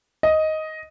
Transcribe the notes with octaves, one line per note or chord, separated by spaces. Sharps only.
D#5